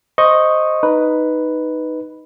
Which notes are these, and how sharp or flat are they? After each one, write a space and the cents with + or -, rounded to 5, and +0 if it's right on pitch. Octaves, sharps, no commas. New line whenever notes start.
C5 +0 D#5 +0 C#6 -10
D#4 +0 B4 +0